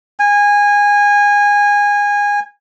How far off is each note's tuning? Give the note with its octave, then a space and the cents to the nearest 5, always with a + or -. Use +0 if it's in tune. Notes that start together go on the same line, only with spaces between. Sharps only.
G#5 -20